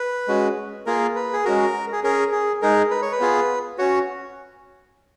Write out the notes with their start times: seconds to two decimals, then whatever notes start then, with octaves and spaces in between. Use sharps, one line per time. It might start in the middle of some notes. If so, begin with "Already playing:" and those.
Already playing: B4
0.28 G#3 C#4 F#4
0.86 A#3 F4 G#4 A#4
1.15 B4
1.33 G#4
1.44 G#3 C#4 F#4 A#4
1.92 G#4
2.03 C#4 G#4 A#4
2.32 G#4
2.62 G#3 D#4 G#4 A#4
2.90 B4
3.02 C#5
3.12 B4
3.20 B3 F4 G#4
3.78 C#4 F#4 C#5